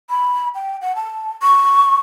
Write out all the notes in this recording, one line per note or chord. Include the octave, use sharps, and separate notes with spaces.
B5
G5
F#5
A5
C#6